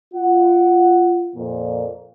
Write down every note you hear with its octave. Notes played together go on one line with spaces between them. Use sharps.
F4 F#5
F2 A#2